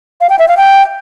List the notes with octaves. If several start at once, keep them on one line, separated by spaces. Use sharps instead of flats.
F5
G5
E5
F5
G5